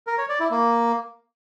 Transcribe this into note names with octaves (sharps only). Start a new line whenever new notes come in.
A#4
C#5
D5
E4
A#3